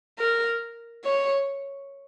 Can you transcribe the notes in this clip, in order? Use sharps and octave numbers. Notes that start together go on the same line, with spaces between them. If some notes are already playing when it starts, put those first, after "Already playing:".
A#4
C#5